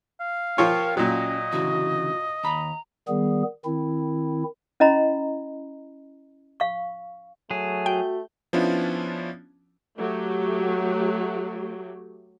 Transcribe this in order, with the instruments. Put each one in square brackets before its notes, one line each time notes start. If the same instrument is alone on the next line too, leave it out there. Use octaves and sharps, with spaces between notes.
[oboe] F5
[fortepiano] F3 F4 C#5 [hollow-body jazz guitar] G4 [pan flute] A#4
[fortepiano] A#2 F#3 [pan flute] C#4 [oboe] D#5
[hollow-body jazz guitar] D2 C#3 E3 [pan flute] F#4
[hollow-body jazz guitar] D#2 B5 [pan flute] A#5
[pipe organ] D#3 G3 B3 G#4
D#3 C4 E4
[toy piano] C#4 E4 D#5 A#5 B5
F5 C#6
[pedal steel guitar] F#3 G#4 [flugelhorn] A3
[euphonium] F#4 [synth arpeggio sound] G5
[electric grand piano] F3 B3 C#4 D4 E4 F4
[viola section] F#3 A3 G4